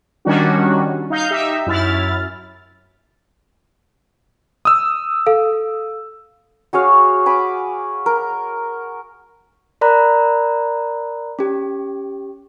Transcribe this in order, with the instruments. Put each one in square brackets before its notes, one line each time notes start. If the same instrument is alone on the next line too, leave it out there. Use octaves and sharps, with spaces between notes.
[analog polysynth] D#3 G3 C#4 D4 F#4
D#4 F5 G6
D#4 G4 E5
F#2 E4 F6 A6
[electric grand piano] D#6 E6
[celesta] A4 F5
[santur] F#4 G#4 C#5 F5
G#5 B5 D6
A#4
[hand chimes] A#4 D5 A#5 B5 F#6
C#4 G4